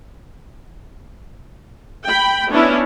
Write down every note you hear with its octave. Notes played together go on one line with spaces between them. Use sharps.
G5 B5
B3 C#4 D4 E4